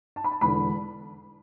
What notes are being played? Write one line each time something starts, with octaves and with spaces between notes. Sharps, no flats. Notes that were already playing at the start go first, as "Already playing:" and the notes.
A5
B5
A5
E1 E2 D3 B5